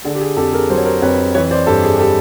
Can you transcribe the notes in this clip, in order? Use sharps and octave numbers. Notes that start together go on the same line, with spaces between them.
D3 G#4
G4
G#4
F2 G4 A4
G#4 A#4
F#3 C5
C#5
A#4 C5
F2 B4 C#5
E3 B4 C#5
C5 D5
G2 G4 A4
G#4
G3 G4 A4